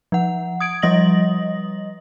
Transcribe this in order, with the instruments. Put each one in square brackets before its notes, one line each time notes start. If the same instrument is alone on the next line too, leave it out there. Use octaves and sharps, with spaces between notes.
[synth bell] F3 F#5
D#6 G#6 D7
F3 G3 D#5 D#6 A#6 F#7